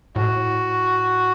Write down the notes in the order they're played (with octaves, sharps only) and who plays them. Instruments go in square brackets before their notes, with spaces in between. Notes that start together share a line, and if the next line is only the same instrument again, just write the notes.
[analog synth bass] A2 [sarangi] F#4